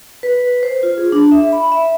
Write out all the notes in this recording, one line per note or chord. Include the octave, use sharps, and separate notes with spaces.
B4
C5
F4
G#4
D4
E5
B5
E5